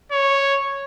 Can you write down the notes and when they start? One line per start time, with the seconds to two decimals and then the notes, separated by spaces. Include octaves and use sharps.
0.12 C#5